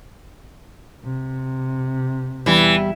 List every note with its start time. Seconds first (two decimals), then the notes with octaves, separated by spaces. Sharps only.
1.03 C3
2.46 E2 E3 G3